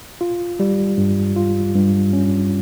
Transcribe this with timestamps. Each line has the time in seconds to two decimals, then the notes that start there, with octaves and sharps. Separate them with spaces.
0.21 F4
0.60 G3
0.98 G2
1.36 F4
1.75 G2
2.13 C#4